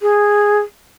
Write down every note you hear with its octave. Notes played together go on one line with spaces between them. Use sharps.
G#4